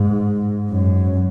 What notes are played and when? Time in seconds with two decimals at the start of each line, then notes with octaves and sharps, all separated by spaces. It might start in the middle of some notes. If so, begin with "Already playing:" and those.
Already playing: G#2
0.70 F#2